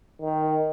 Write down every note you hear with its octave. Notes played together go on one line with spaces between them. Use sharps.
D#3